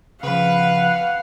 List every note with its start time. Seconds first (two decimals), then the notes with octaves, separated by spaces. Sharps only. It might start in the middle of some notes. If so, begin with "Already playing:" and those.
0.23 C#3 F3 B4 F5 F#5